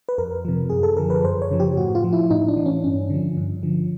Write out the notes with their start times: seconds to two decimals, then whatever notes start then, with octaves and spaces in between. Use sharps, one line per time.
0.09 B4
0.18 F2 A#4
0.45 C3 F3
0.70 F#2 G#4
0.83 A4
0.97 D3 F3 A#4
1.10 B4
1.24 F#2 C5
1.42 C#5
1.51 C#3 F3
1.60 G4
1.77 A2 F#4
1.95 F4
2.04 F3
2.13 E4
2.30 A2 D#4
2.48 D4
2.57 E3
2.66 C#4
2.84 G2 C#4
3.10 D3 F3
3.37 G2
3.63 D3 F3